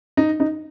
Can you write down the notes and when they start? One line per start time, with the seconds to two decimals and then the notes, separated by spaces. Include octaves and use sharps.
0.17 D#4
0.40 D#4